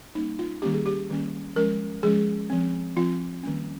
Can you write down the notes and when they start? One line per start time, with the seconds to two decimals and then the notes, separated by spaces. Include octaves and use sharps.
0.15 G3 A#3 C#4 D#4
0.39 F4
0.62 D#3 G3 A#3 C#4 G4
0.74 G#4
0.86 G4
1.10 D#3 G3 A#3 C#4
1.56 F3 G#3 C#4 A#4
2.03 F3 G#3 C#4 G#4
2.50 F3 C4
2.97 F3 C4 F4
3.43 D#3 G3 A#3 C#4